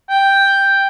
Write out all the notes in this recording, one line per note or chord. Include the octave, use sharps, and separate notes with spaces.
G5